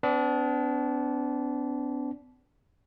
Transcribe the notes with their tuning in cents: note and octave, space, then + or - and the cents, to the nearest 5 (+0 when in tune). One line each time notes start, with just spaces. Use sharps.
B3 +45 D4 -25